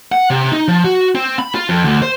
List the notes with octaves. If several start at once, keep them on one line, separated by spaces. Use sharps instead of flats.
F#5
C3
D#4
F3
F#4
C4
B5
F4
F2
D2
C5